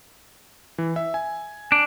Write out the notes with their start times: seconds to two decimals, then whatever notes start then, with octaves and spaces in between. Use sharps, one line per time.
0.78 E3
0.96 E5
1.14 G#5
1.72 D4